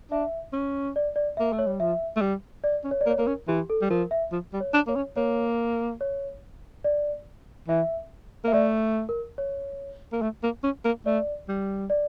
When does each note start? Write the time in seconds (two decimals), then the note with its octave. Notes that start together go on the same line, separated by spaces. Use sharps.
0.11 D4 E5
0.53 C#4
0.96 D5
1.16 D5
1.37 E5
1.40 A#3
1.53 A3
1.59 C#5
1.67 G3
1.80 F3 E5
2.16 A3
2.21 G3
2.64 D5
2.84 C#4
2.91 C#5
3.01 D5
3.06 A#3
3.10 C#5
3.18 A#3 A#4
3.27 C#4
3.48 E3 G4
3.70 A4
3.82 G3
3.90 F3 A#4
4.11 E5
4.32 F3
4.54 G3
4.60 C#5
4.74 D4
4.87 A#3 C#5
4.96 C#4
5.16 A#3 C#5
6.01 C#5
6.84 D5
7.68 E3 E5
8.44 A#3 E5
8.53 A3 D5
9.09 A#4
9.38 C#5
10.13 A#3
10.22 A3
10.43 A#3
10.64 C#4
10.85 A#3
11.06 A3 D5
11.49 G3
11.90 D5